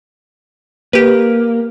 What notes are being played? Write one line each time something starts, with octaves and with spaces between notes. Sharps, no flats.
A#3 G4 B4